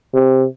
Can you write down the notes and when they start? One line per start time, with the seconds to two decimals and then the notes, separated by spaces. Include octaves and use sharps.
0.14 C3